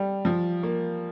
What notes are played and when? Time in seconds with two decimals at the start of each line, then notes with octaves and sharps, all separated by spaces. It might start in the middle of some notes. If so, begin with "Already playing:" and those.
Already playing: G3
0.25 F3
0.63 A#3